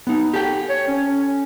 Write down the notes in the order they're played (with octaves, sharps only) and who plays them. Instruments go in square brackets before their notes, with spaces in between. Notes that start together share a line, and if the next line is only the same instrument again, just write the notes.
[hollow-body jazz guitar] B3 D#4
G4 A4 G5
[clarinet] C#5
C#4